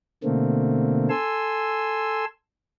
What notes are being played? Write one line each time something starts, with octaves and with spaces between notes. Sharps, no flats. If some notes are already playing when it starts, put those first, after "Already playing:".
B2 D3 A3 A#3 C4
A4 G#5 C6 E6